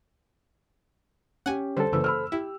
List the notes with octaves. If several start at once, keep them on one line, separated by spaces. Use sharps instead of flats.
C#4 G4 F#5 G#5
D3 G3 A4 C5
F#1 F#2 C#3 E3 B4 E6
B5 E6 F6
E4 G4